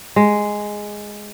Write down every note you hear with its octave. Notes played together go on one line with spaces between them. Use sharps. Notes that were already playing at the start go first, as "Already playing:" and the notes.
G#3